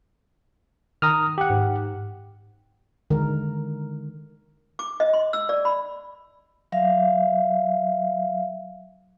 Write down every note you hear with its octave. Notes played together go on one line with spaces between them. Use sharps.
D#3 A#5 D#6 F6
G4 F#5
G#2
D3 D#3 G#3 A#4
D6
D#5
C6
E6
D5
B5
F#3 E5 F5